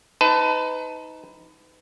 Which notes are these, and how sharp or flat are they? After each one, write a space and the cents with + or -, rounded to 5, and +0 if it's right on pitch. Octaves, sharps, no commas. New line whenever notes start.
D#4 +25 B4 +35 A5 +0